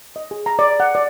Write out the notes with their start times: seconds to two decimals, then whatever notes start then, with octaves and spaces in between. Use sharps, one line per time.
0.16 D#5
0.31 G#4
0.46 A#5
0.59 D5
0.80 F#5
0.95 D5